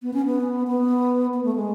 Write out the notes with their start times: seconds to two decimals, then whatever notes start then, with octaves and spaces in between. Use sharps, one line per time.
0.02 B3
0.14 C#4
0.26 B3
0.67 B3
1.34 B3
1.44 A3
1.56 G#3